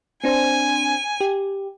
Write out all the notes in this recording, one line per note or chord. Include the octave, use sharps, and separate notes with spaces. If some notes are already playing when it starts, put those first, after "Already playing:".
C4 D4 C5 G#5
G4